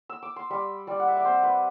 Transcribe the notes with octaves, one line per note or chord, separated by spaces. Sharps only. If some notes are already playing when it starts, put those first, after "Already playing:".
E6
D6
C6
G3 B5
G3 D5
F#5
E5
D5
C4 C5
B4